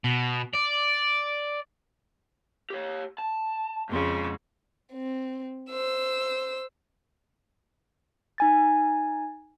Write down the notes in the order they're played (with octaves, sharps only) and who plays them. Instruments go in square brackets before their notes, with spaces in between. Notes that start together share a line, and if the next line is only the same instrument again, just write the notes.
[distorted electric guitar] B2
D5
[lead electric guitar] G4 C#5
A5
[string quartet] F2 C#3 [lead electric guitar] G#2 C6
[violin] C4
C5 E6
[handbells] D#4 G#5 A6